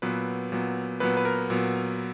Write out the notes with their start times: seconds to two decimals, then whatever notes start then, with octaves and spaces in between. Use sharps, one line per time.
0.02 A#2 F#3 B3 B4
0.52 A#2 F#3 B3
1.00 A#2 F#3 B3 B4
1.17 B4
1.25 A#4
1.50 A#2 F#3 B3